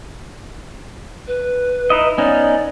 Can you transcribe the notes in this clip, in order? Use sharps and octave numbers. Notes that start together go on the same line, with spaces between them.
B4
D#4 E4 D#5
B3 C#4 D#4 D5